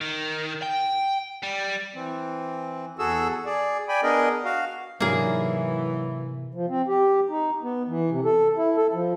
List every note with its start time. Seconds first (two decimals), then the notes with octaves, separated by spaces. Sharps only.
0.01 D#3
0.63 G5
1.43 G3
1.95 E3 C4
2.99 E2 F#4 G#4 A4 E6
3.45 G#4 D5
3.88 D5 G5 G#5 B5
4.03 B3 D4 G#4 A#4 D#5
4.45 F#4 F5
5.00 G#2 C3 E3 F#3 A#3 D4 F#4 G#4
6.54 F3
6.69 C4
6.88 G4
7.30 D#4
7.63 B3
7.88 E3
8.10 C3
8.25 A4
8.57 E4
8.77 A4
8.93 F3